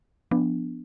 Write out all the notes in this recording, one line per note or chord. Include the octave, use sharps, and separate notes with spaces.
F3 B3 D4